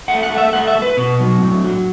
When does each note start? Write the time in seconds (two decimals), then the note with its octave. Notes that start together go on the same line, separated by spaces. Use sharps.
0.08 A3 F#5
0.23 F#5
0.30 A3
0.38 E5
0.53 A3 F#5
0.67 E5
0.76 A3
0.82 B4
0.97 B2
1.20 F#3
1.41 A2
1.64 F#3